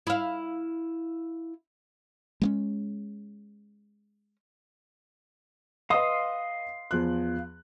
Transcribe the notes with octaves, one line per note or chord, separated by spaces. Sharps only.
E4 F5
G#3 A#3 C#4
B4 D#5 F5 C6 D#6
E2 F3 F#6